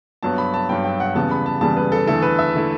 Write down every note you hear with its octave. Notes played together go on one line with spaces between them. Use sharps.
G2 F#3 B3 A5
B5
A5
G2 F#3 B3 G5
G5
F#5
E2 C#3 G3 B3 A5
B5
A5
E2 C#3 G3 B3 A5
B4
A4
E2 D3 A3 E4 A4
B4
E5
D3 A3 E4